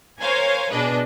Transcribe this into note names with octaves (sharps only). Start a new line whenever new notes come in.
A#4 C5 C#5 F5 G#5
B2 D4 G#4 B4 D#5